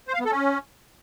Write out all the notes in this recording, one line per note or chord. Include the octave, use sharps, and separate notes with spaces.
C5
F5
B3
A4
C#4